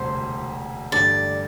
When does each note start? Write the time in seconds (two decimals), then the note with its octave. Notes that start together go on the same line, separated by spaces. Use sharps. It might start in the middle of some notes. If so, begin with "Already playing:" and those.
Already playing: E1 D2 C3 G3 C5
0.92 A1 G2 D3 G3 D5